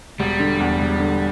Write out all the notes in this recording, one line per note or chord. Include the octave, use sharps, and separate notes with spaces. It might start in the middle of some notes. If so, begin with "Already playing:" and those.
E1 G3
D3
E2
E1
D3